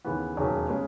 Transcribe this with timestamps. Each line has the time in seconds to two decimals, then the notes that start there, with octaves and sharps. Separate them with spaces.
0.04 D#2 C#3 E3 B3
0.37 E1 D#2 C#3 F#3
0.69 C#3 G#3 C#4